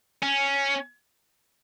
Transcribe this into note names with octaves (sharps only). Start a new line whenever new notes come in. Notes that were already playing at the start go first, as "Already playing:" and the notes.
C#4